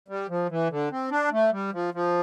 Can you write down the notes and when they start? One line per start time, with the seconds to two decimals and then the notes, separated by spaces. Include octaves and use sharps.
0.08 G3
0.29 F3
0.50 E3
0.70 D3
0.91 C4
1.11 D4
1.32 A3
1.52 G3
1.73 F3
1.94 F3